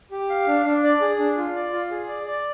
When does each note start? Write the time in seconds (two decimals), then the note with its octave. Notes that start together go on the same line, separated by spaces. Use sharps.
0.11 G4
0.30 F5
0.47 D4
0.66 D4
0.83 D5
1.01 G#4
1.19 D4
1.37 F4
1.55 D5
1.73 F4
1.91 G#4
2.08 D5
2.27 D5